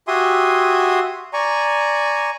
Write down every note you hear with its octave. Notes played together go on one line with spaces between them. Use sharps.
F#4 G4 E5 G#5 C6 D#6
D5 G#5 A#5 C#6